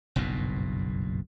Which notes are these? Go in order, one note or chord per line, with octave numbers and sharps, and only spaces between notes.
F#1 B1 G2 A#2